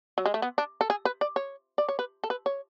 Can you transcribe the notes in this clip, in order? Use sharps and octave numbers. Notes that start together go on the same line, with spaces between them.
F#3
G#3
A3
B3
D4
A4
G#4
B4
D5
C#5
D5
C#5
B4
A4
B4
C#5